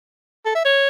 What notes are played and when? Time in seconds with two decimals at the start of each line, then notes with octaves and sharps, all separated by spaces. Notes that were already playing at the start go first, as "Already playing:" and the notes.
0.45 A4
0.55 E5
0.65 C#5